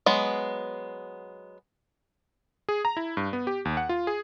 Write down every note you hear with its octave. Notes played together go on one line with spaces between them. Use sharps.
F#3 G#3 B3
G#4
A#5
E4
G2
B3
G4
D#2
F#5
F4
G#4